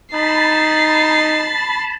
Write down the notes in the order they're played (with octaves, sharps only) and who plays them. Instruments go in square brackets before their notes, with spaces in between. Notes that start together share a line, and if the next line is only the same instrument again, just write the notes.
[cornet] D#4 [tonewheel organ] A5 B5 [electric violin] A6 C7